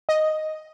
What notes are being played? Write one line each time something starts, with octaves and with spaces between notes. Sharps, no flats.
D#5